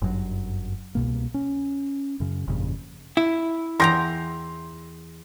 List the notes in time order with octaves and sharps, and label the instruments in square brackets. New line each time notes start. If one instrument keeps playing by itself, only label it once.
[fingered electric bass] G1 F#2 C3 F#3
C2 B2 A#3
C#4
F#2 C#3
G1 F2 A#2 C#3
[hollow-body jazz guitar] E4
[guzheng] E2 G5 A#5 [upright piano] C6 A#6